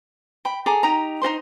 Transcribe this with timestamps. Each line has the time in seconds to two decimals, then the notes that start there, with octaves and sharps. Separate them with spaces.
0.45 G5 B5
0.66 G#4 A4 A#5 D6
0.83 D#4 G4 A#5
1.22 D#4 F#4 C5 C6